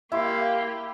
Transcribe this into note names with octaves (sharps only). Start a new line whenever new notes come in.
A#3 E4 G4 E5 F5 C6